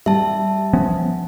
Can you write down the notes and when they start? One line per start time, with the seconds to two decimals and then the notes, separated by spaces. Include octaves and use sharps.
0.06 G3 E5 A5
0.73 F3 B3 C#4